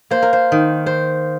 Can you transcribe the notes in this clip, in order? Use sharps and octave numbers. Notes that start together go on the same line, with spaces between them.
A#3 C5
A#4
C5
D#3
C5